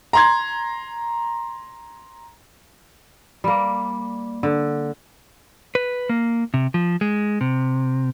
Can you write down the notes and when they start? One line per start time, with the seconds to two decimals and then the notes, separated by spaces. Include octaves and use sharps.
0.13 A#5 C6 G#6
3.44 G3 A#3
4.43 D3
5.75 B4
6.09 A#3
6.54 C3
6.74 F3
7.01 G#3
7.41 C3